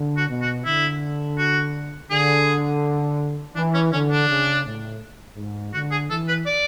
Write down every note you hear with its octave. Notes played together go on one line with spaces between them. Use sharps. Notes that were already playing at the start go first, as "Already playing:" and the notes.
Already playing: D3
F#4
B2
F#4
D3 E4
F#4
D3 G#4
E3 D4
C#4
D3 C#4
D4
C#3
A2
G#2
D3 F#4
G#4
E3 A4
B4
D5